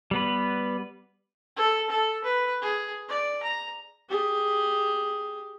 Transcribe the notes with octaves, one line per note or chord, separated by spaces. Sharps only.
G3 B3 B4
A4
A4
B4
G#4
D5
A#5
G4 G#4